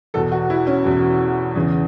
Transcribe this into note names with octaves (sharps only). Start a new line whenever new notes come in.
E2 B2 A4
F#4
E4
C#4
E2 B2
E2 C#3 E3